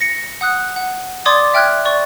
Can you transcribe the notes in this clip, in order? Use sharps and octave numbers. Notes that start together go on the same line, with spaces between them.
A#6 C#7
F#5 D#6 F#6
F#5
D5 C6 D6 D#6 G#6 A6
E5 G5 F6 F#6 G#6
D5 C#6